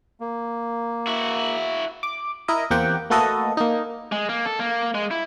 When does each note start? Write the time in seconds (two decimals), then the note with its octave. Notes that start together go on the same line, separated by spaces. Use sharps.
0.20 A#3
1.07 E4 F#4
2.03 D6
2.48 E4 A#4 D#5
2.70 E2 A#3 C4 G4 F#5 G5
3.10 A3 A#3 F#4 A4 B4 D#5
3.57 A#3 D#4
4.12 G#3
4.29 A#3
4.46 A4
4.59 A#3
4.95 G#3
5.11 E4